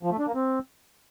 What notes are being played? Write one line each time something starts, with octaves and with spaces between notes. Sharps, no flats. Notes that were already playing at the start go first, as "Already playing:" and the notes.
F3
A3
D4
A#3
C4